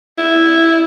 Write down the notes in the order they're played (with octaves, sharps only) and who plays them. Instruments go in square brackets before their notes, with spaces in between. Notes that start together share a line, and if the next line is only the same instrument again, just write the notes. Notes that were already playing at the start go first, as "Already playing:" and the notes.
[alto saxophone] E4